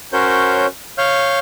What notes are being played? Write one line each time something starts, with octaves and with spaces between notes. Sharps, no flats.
C#4 F#4 A#4 C5 C#5 G6
C#5 F5 F6 G6